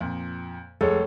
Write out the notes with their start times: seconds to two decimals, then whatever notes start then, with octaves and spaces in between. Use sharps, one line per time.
0.01 F2 A#2
0.81 F1 G#3 A4 C#5